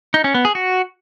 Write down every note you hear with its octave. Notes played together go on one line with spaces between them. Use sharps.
D#4
C#4
B3
G#4
F#4